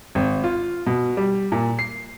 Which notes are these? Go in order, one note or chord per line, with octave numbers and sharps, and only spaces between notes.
G#1
F4
B2
G3
A#2
C7